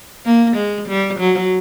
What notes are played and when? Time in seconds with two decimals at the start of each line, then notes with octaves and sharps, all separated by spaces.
0.25 A#3
0.56 G#3
0.88 G3
1.19 F#3